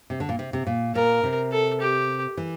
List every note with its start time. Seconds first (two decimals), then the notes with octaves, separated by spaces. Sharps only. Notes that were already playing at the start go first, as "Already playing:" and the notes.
0.10 C3
0.20 D3
0.29 A#2
0.39 C3
0.53 C3
0.67 A#2
0.95 A#2 A#4
1.24 C3
1.52 A4
1.81 G4
2.37 E3